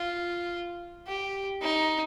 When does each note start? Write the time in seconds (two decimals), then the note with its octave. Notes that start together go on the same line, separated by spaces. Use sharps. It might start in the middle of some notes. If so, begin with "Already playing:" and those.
Already playing: F4
1.07 G4
1.61 D#4